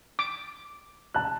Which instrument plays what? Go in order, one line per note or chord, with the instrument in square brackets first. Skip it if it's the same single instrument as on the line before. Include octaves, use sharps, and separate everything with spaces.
[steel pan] D6
[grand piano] A5 F#6